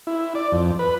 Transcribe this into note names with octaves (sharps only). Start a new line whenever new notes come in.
E4
D5
F2
B4